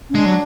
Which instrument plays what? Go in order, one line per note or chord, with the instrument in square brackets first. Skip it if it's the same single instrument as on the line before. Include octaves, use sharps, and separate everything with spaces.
[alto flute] C#4
[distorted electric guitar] G#3 [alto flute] D4
[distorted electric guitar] F#3